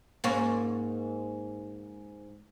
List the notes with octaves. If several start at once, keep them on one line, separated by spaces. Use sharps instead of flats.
G#2 A#3 C#4